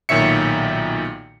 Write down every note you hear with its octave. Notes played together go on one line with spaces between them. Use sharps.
B1 A#2 D#3 C#5 E5 C#7